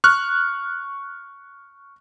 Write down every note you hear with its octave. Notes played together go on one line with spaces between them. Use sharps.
C#6 F6 F#6